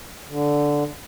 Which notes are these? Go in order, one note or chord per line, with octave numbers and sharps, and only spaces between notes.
D3